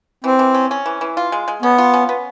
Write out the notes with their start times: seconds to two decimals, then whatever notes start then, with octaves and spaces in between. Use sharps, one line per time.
0.24 E3 C4
0.39 E3
0.54 C#4
0.71 C#4
0.86 E3
1.01 E3
1.17 F4
1.32 G#3
1.48 G#3
1.62 B3 C#4
1.78 F4
1.94 C#4
2.09 B3